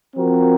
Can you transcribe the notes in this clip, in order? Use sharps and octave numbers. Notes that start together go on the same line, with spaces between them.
F3 C4 F#4 A#4